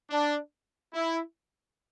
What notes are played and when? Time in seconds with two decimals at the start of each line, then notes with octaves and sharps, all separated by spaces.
0.10 D4
0.94 E4